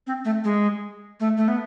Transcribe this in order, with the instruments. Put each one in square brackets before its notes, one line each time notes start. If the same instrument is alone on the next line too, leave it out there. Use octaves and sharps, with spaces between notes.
[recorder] C4
A3
G#3
A3
A3
B3